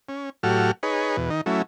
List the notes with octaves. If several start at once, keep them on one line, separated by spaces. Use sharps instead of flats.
C#4
A2 F#3 F#4 G4 A4 F6
D#4 G#4 B4 C#5
E2 B2
D#3 D#4
F#3 A3 C#4 E4